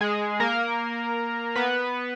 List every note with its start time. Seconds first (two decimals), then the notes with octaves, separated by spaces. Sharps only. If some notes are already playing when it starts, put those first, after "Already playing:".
0.01 G#3 G#4
0.40 A#3 A#4
1.55 B3 B4